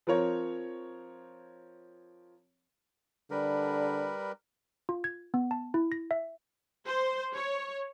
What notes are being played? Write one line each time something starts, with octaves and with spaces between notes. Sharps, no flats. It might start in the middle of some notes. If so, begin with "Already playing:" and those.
F3 C4 A#4 C#5
D3 G3 A#4 B4
F4
G#6
B3
A5
E4
A#6
E5
C5
C#5